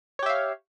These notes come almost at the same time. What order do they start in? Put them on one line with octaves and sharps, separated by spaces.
C#5 G4 E5 F5